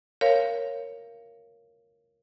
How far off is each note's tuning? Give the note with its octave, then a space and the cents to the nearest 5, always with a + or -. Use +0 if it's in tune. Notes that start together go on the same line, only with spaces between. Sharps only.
A#4 +0 C#5 +0 F5 -15